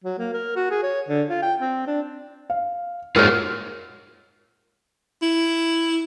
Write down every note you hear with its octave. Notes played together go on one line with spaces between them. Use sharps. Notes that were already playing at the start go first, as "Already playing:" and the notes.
F#3
A#3
A#4
F#4
G#4
C#5
D3
F4
G5
C4
D4
F5
G#2 A#3 F4 F#4 G#4 A#4 C#5 F6
E4